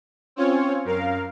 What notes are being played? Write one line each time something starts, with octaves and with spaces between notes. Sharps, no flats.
C4 C#4 F4 C#5
F#2 A#4 F5